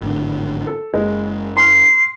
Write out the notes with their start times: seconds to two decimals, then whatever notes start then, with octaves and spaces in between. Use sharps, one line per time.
0.01 G#1 A2 D3
0.67 A4
0.94 F#1 G#3
1.57 C6 F6 C7